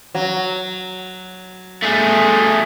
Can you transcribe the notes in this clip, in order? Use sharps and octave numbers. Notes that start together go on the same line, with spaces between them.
F#3
A3 G#4